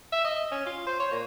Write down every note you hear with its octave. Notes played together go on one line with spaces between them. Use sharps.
E5
D#5
C#4
F4
C5
C#5
A#2